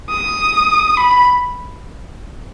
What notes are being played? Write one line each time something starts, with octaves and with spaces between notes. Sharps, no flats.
D#6
B5